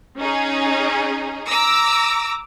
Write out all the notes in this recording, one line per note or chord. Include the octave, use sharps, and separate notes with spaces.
C#4 D#4 G#4
A#5 D6 E6 A#6